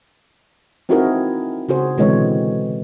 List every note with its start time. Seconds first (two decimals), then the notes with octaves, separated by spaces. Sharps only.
0.89 C4 D#4 E4 F#4 G#4 A#4
1.69 C#3 F#4 G#4 C5
1.98 B2 D3 E3 G#3 C4 C#5